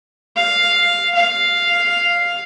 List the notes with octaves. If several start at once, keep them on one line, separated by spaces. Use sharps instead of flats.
F5
F5